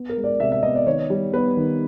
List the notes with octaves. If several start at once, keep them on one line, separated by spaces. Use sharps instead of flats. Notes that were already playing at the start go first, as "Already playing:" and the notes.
Already playing: B3
A#4
G#3
D5
C3 E5
E5
B3 D#5
D5
D#3 C#5
G3
B3 B4
D#3